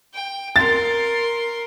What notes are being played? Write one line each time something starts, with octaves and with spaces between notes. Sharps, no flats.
G5
A#4 C6 A6